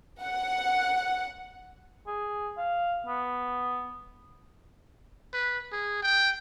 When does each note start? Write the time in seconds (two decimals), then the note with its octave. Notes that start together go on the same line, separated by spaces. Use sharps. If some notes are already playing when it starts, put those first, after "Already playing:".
0.23 F#5
2.07 G#4
2.57 F5
3.06 B3
5.33 B4
5.72 G#4
6.02 G5